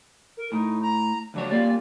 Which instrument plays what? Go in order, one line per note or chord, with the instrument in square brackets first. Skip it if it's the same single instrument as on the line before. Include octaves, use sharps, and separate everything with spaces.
[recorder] A#4
[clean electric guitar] A2 [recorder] D#4
[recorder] A#5
[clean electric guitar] C#2 F#3 C#5 [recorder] D4
[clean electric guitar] G3 A#3 F4 [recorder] D5